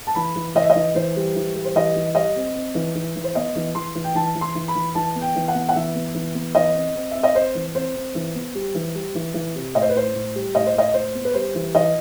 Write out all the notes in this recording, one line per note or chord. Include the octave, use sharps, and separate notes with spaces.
A5
E3 B5
E3
E3 D#5
E5
D#5
E3
E3 C5
G3
E3
G3
C5
E3 D#5
E3
G3 D#5
C4
C4
E3
E3
E3
C5
B3 D#5
E3
E3 C6
E3
G5
E3 A5
E3
C6
E3
B5
E3
E3 A5
B3
G5
E3
F#5
B3
F#5
E3 E5
B3
E3
B3
E3 D#5
C4
C4
C4 E5
D#5
C4 C5
E3
C4 C5
C4
E3
B3
G3
E3
G3
E3
E3
C3
A2 D#5
C5
B4
A2 C5
A2
G3
A2 D#5
C5
A2 D#5
A2 C5
B3
B4
G3 C5
E3
E3 D#5